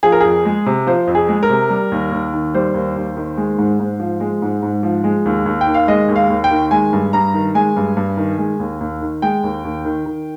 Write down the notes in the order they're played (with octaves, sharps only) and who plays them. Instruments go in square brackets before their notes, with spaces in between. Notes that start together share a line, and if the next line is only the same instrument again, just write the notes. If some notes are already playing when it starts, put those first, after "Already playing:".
[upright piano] F3 G#4
A#4
F2 G#4
G#3
C3
F3 C5
F2
G#4
G#3
A#4
C3
G3
D#2
D#2
D#3
G3 C5
D#2
D#2
D#3
G#3
G#2
G#2
F3
G#3
G#2
G#2
F3
G#3
D#2
D#2
G5
D#3
F5
G#3 D#5
D#2
F5
D#2
G5
D#3
G#3 G#5
G2
G2 A#5
D#3
G#3 G#5
G2
G2
D#3
G#3
D#2
D#2
D#3
G#3 G5
D#2
D#2
D#3
D#3